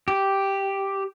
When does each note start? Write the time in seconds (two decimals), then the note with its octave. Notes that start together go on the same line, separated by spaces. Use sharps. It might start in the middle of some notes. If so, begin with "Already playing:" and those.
0.08 G4